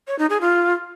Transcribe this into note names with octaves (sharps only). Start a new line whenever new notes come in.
C#5
D#4
G#4
F4